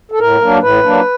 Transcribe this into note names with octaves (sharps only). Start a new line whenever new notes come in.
A4
A2 A#4
F#3 A#3 D4
A2 B4
F#3 A#3 D4